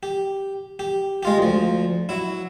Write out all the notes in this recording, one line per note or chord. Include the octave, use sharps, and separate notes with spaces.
G4
G4
G#3 F4 G4
D2 F3
F#3 E4